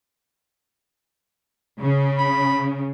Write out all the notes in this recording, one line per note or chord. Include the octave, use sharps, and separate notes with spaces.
C#3
B5